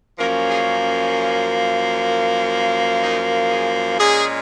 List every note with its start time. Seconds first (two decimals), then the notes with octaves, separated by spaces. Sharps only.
0.18 F#2 F3 A#3 C#4 A#4
0.50 G#4
0.82 C#4
3.03 D#4
3.50 G#4
3.97 A#2 G#3 C#4 G#4